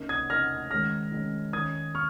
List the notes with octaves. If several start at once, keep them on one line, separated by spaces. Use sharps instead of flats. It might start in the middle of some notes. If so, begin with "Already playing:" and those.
Already playing: C#3 A#3 D#4
D#6 G#6
C#3 A#3 D#4 F6 A#6
D#3 G#3 C#4 F6 A#6
D#3 G#3 C#4
D#3 C#4 D#6 G#6
C#6 F6